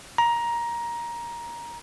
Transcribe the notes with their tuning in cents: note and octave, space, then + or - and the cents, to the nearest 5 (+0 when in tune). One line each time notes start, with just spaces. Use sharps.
A#5 +15